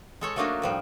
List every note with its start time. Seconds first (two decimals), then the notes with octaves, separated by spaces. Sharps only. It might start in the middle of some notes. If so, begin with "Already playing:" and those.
0.21 G#3 A4 C#5
0.36 F#3 A3 A#3 D4 D#4 F#4
0.62 A2 F3 G3